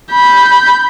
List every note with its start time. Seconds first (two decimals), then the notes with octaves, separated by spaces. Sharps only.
0.11 B5 G6